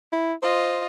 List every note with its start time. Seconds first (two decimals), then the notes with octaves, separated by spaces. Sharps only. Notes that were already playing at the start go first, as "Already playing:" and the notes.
0.13 E4
0.43 F4 C5 D#5